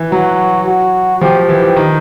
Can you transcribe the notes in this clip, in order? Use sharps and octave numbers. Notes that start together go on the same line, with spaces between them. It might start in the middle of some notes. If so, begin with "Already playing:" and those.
Already playing: E3
F#3 F#4
F#4
F3 G4
E3
D#3